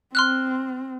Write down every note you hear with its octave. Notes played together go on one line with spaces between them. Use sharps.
C4 C6 F6 F#6